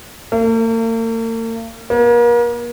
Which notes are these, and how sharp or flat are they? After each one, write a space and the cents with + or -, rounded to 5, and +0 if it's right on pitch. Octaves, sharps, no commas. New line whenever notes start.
A#3 -45
A#3 +40